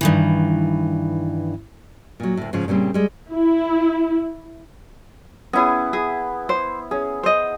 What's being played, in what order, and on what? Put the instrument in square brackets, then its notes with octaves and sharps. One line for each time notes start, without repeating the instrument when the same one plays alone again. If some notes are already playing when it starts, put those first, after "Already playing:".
[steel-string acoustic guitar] G2 D#3 E3
[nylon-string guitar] A#2 F#3
D2 A2
G#2 C#3 F3
A#2 C#3 G3 C4
G3 G#3
[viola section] E4
[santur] B3 E4 [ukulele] C#4 G#4
[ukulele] G#4
C5
[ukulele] C#4 [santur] G#4
[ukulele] C5 D#5